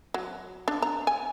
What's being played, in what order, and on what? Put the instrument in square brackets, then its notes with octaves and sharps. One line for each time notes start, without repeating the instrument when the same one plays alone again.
[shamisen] F#3
D4
A#5
G#5